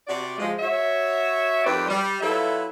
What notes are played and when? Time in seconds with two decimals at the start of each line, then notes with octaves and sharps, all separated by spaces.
0.08 C3 F#4 G4 D5
0.38 F3 G#3
0.60 F#4 C#5 E5
1.65 F2 D#3 C4 G4 B4 D5
1.89 G3
2.21 F#3 E4 F4 A4 B4 E5